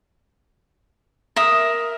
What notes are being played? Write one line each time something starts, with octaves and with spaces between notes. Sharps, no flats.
A#4 E5 D#6